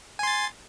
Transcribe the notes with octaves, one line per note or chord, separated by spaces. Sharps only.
G#5 C6 A6